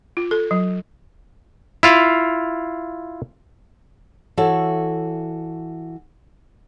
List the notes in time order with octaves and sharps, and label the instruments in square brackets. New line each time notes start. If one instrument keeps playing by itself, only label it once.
[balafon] F4
A4
F#3
[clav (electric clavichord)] E4 F4 F5
[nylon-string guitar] E3 F#4 A4 C#5 E5